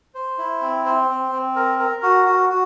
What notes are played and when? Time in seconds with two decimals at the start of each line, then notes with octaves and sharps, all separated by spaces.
0.15 C5
0.38 E4
0.61 C4
0.86 C5
1.09 C4
1.32 C4
1.56 A#4
1.79 A#4
2.03 F#4
2.26 F#4
2.50 F#4